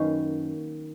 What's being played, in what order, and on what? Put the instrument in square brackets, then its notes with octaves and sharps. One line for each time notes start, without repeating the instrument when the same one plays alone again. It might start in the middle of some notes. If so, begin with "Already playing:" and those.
Already playing: [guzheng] F#2 D#3 A#3 C#4 B4